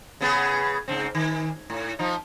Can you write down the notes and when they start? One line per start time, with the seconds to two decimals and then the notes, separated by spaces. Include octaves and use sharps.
0.21 C#3 B3 G#4
0.88 G#2 C#3 C4
1.15 D#3
1.70 A2
1.99 F3 D#4